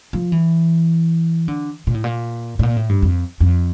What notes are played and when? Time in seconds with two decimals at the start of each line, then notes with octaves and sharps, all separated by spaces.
0.13 F3
0.32 E3
1.48 D3
1.87 A#2
1.94 A2
2.04 A#2
2.59 A2
2.63 A#2
2.77 A2
2.89 G2
3.02 F2
3.40 F2